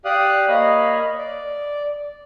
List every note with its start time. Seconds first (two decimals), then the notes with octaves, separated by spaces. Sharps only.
0.05 G4 D5 F5 D#6 F#6
0.49 A#3 C#5 D#5 F5 B5
1.18 D5